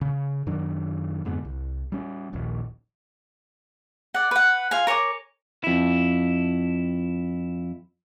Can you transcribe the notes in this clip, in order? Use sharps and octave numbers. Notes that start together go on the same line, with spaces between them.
C#3
F#2 D#3 F#3 D4
F2 G#2 D3 B3
C2
G3 C#4
D#1 A#1 D#2
D5 F#5
B4 F#5
F4 F5 G#5
A#4 C#5 G#5 D6
F2 E4